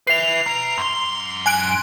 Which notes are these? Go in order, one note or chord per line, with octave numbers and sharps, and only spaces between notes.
B4 E5 C7 F7
B4 A#5
F#2 C6
G#5 F#6 D7